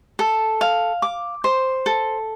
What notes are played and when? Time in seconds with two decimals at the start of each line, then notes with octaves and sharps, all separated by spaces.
0.19 A4
0.61 F5
1.02 D6
1.44 C5
1.86 A4